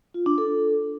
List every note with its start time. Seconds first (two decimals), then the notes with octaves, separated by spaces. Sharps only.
0.14 F4
0.26 D4
0.38 A4